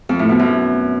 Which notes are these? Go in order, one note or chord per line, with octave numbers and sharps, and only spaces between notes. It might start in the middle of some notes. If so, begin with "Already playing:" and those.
F2
A2
B2
F#2